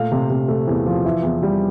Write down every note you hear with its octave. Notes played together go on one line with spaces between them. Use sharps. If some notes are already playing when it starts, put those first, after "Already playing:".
Already playing: A#2 A3 F5
C3
C3
A3
E2
F3
E3 E5
E2
G3